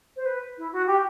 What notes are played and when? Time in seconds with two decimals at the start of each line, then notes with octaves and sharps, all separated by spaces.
0.16 C5
0.26 B4
0.58 E4
0.72 F#4
0.87 G4